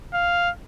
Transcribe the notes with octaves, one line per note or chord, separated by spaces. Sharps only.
F5